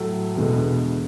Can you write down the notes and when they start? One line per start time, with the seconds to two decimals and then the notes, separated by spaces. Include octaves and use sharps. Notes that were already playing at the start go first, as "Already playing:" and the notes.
Already playing: A2 F#3 A3
0.35 E2 B2 D3 G#3